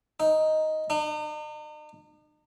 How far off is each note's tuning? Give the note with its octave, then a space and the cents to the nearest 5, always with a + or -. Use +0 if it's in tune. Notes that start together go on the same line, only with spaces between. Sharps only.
D#4 +5
D#4 -45